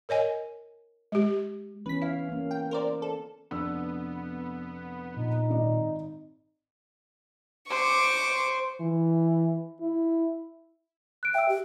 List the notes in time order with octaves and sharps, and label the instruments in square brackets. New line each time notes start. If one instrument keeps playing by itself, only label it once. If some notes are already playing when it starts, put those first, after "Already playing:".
[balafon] A#4 C#5 D#5 G#5
G#3 G4
[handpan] E3 B3 C#4 [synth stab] B4 B6
[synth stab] E4 [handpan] F5
[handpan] A#3 C#4
[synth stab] G5
A#4 C5 D5
A4
[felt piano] F1 D4 E6 [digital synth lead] B3
[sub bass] A#2 [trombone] D#4
[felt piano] G#1 D5 D#5
[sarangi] C5 [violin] C#6 D6
[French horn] E3
E4
[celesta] F#6 D7
[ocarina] E5 [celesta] G5 E6
[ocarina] G4